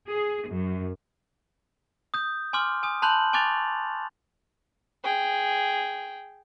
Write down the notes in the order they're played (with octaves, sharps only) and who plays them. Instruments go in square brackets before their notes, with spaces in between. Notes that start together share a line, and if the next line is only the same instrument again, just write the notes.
[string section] G#4
F#2
[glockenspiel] D#6 G6
G#5 C6 D6 F6
G#5 D#6
A5 B5 C6 F#6 G6 F#7
G#5 C#6 D6 F#6 A6 F7
[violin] G#4 G5